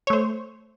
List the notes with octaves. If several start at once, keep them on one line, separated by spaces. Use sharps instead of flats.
A3 C5 C#5